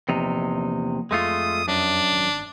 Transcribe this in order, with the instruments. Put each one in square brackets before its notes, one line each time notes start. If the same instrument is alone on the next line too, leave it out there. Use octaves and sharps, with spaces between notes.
[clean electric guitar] E2 C3 D#4 [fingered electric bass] F3 A#3
[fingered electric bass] F2 [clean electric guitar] G#3 A3 F4 [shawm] D#6
[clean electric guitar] F#2 [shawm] D4
[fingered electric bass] G#1